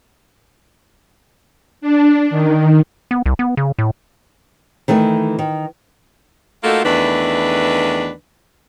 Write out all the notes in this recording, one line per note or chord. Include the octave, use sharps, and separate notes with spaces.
D4
D#3
B3
C2
B3
C#3
A2
D#3 E3 A3 C#4 D#4
D#3
A3 A#3 D#4 F4 F#4 A4
E2 D#3 A3 D4 B4